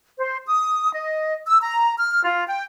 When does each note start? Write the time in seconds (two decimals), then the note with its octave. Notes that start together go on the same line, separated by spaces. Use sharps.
0.17 C5
0.46 D#6
0.93 D#5
1.45 E6
1.61 A#5
1.97 F6
2.24 F4
2.46 G5